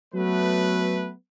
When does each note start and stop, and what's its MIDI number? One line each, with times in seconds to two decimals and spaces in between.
0.14 1.12 54
0.14 1.12 57
0.14 1.12 59
0.14 1.12 71